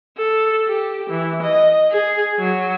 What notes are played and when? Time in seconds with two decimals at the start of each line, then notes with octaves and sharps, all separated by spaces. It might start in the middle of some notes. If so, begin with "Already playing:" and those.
0.18 A4
0.68 G4
1.10 E3
1.43 D#5
1.92 G#4
2.40 F#3